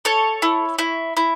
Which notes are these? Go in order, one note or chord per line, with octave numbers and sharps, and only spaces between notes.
A4 C#5
E4
E4
E4